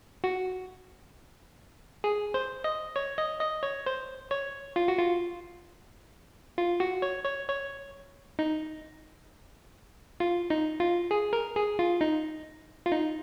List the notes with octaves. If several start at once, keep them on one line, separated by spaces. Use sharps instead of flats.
F#4
G#4
C5
D#5
C#5
D#5
D#5
C#5
C5
C#5
F4
F#4
F4
F4
F#4
C#5
C#5
C#5
D#4
F4
D#4
F4
G#4
A#4
G#4
F4
D#4
F4
D#4